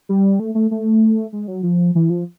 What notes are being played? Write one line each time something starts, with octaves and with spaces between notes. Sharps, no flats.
G3
A3
A3
A3
G#3
F#3
F3
E3
F3